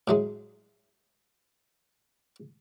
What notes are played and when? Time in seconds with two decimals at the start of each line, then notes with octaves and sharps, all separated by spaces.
0.08 A2 F#3 G#3